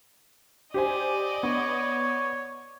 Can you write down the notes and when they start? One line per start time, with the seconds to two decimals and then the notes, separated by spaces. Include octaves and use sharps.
0.74 G4 C5 D5 D#5 G#5
1.43 B3 C#5